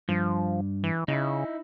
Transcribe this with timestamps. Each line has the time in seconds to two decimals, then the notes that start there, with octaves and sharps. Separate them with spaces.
0.09 G2 F3
0.84 E3
1.08 C#3 D#4 E4